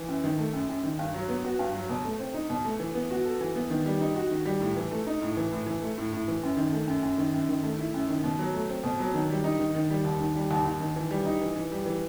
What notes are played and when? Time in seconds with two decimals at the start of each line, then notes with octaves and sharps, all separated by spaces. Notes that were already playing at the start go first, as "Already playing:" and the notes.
Already playing: E3
0.08 F#2
0.24 D#3
0.39 A3
0.53 F#2
0.69 F#2
0.83 D#3
0.99 G2
1.14 F#3
1.29 B3
1.44 F#4
1.59 G2
1.75 F#3
1.89 B2
2.05 A3
2.19 C4
2.34 D#4
2.50 B2
2.65 A3
2.80 E3
2.95 B3
3.11 F#4
3.25 A4
3.41 E3
3.56 B3
3.70 D#3
3.86 G3
4.01 D#4
4.16 F#4
4.31 D#3
4.46 G3
4.61 A2
4.76 E3
4.91 A3
5.07 D#4
5.21 A2
5.37 E3
5.52 A2
5.66 E3
5.82 A3
5.98 A2
6.13 A2
6.28 E3
6.43 F#2
6.57 D#3
6.72 A3
6.87 F#2
7.03 F#2
7.18 D#3
7.34 F#2
7.49 D#3
7.63 A3
7.79 E4
7.94 F#2
8.08 D#3
8.24 B2
8.39 F#3
8.54 A3
8.70 C4
8.84 B2
8.99 F#3
9.14 D#3
9.30 G3
9.44 D#4
9.59 D#3
9.75 D#3
9.91 G3
10.05 D#2
10.20 D#3
10.36 G3
10.51 D#2
10.66 D#2
10.80 D#3
10.96 E3
11.11 G3
11.25 D#4
11.42 E3
11.56 E3
11.72 G3
11.86 E3